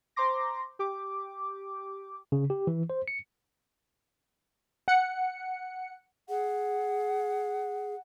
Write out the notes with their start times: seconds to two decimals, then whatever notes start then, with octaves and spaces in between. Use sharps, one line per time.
0.16 C5 A#5 C6 D6 A#6
0.79 G4 D6
2.32 C#3
2.50 G4
2.67 E3
2.90 C5
3.08 C#7
4.88 F#5 C#7
6.29 G#4 F#5